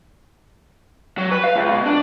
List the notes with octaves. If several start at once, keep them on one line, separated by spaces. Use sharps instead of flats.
F#3
B4
F5
C#2
B2
D4